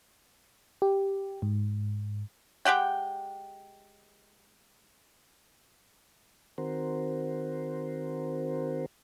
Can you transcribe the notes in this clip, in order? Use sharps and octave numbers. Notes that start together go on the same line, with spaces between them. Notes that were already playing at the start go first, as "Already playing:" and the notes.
G4
G#2
G#3 G4 F#5 G5
D#3 C4 F#4 A#4 C5